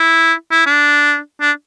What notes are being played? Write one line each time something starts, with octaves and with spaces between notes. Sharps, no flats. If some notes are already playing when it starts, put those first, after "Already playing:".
Already playing: E4
E4
D4
D4